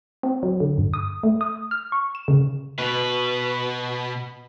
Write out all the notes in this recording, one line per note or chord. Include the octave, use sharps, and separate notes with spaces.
C4
F#3
D3
G2
D#6
A3
D#6
F6
C#6
E7
C#3
B2 B4